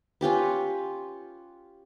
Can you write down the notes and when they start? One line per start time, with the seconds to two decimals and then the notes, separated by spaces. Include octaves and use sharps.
0.21 C#4 F4 G4 B4